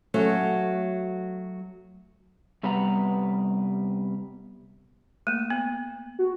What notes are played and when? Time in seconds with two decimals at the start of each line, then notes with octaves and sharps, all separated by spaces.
0.14 F#3 A3 C#4 F#4
2.63 C3 G3 B3 B4 F#5 A#5
5.27 A3 A#3
5.50 B3
6.19 F#4